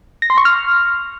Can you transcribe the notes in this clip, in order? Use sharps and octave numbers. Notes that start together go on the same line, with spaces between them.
A#6
C6
C#6
F6